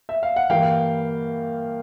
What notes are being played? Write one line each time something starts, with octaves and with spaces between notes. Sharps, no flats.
E5
F5
F#5
G2 E3 G3 A#3 F5 G5